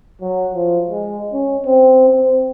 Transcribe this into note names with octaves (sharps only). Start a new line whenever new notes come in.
F#3
F3
G#3
C#4
C4
C4